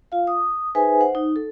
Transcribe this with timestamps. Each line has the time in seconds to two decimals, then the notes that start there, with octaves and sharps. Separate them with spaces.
0.12 F4 F5
0.27 D#6
0.75 D#4 G#4 B4 C5 E5 G#5
1.01 C5 F#5
1.15 D#4
1.36 A4